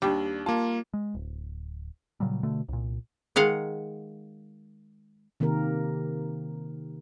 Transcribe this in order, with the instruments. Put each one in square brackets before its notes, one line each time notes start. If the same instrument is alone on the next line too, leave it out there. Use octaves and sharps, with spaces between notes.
[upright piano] D#2 D4 [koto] G3
[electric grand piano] A#3 F4 [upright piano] A5
[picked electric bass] G#3
D1
A#2 C#3 F#3 G3
B2 D3 A3
C2 A#2
[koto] D#3 G#3 F5 F#5
[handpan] C3 D#3 A#3 G4 A#4